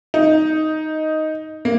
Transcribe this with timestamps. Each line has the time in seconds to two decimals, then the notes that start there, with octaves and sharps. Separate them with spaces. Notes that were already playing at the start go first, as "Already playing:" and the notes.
0.14 D#4
1.65 A#3